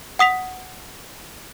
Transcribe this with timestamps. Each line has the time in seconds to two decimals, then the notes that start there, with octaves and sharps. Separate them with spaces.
0.19 F#5 D#6 B6 F7